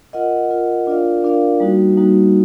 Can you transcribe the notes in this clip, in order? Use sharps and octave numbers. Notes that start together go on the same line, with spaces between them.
F4 A#4 D#5 F#5
F4 A#4 D#5 F#5
D4 F4 A#4 D5 F5
D4 F4 A#4 D5 F5
G3 A#3 D#4 F#4
G3 A#3 D#4 F#4